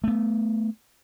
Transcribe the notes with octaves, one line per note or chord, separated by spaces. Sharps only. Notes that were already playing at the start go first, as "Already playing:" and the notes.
A3 B3